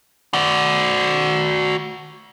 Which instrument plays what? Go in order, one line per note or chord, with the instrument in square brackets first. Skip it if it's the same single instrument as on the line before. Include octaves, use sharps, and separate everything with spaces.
[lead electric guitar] F#4 D5